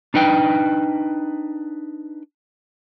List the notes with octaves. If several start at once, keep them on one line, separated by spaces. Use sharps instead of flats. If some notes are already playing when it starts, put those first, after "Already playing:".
D4 D#4 B4 G5